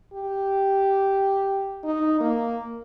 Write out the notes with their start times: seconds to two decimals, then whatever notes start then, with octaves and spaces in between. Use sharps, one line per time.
0.13 G4
1.84 D#4
2.21 A#3